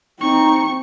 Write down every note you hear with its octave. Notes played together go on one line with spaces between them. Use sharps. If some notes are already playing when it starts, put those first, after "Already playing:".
C4 D#4 C#6